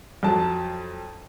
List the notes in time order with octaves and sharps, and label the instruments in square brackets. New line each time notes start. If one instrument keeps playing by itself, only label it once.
[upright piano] F2 F#3 A5